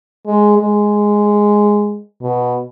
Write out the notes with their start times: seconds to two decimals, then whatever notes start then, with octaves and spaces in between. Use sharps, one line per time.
0.27 G#3
0.59 G#3
2.22 B2